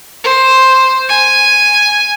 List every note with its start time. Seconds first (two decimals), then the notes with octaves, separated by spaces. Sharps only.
0.24 C5
1.09 G#5